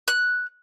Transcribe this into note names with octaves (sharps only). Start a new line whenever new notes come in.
F#6